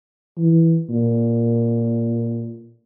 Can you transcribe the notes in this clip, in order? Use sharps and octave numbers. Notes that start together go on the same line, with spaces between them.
E3
A#2